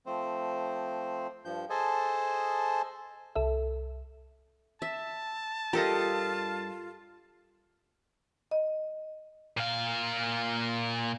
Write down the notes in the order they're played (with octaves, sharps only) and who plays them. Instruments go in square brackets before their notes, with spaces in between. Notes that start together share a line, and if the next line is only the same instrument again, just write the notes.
[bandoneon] F3 A3 C4 C5
G2 F3 G6
G#4 A4 C5 D#5 G#5 A5
[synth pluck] C2 A4 E5
[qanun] E5 [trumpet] A5
[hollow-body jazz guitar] G2 A#4 A#5 [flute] F4 [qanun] G4 A4 D#5
[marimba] D#5
[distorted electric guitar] A#2 F5